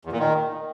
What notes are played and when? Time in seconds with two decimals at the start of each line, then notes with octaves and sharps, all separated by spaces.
0.05 E2
0.12 A#2
0.19 D#3